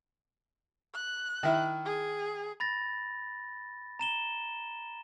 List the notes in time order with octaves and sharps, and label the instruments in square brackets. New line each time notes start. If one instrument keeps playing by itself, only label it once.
[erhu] F#6
[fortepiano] D#3 E4
[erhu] G#4
[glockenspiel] B5 A6 A#6
A#5 E7 G7